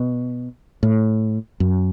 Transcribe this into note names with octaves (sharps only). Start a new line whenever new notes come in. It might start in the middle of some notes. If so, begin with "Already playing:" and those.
Already playing: B2
A2
F#2